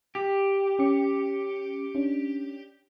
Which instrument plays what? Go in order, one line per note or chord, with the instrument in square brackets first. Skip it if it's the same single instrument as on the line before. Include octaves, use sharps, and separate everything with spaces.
[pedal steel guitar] G4
[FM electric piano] C#4 D6 C#7
C#4 D4